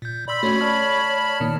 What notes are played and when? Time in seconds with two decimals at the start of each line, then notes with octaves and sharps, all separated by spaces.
0.02 A#2 G6
0.28 D5 B5 C6 E6
0.43 A3 C#4 F#4 C#5
0.61 D5 A5 F6
1.40 A#2 D#3 A#3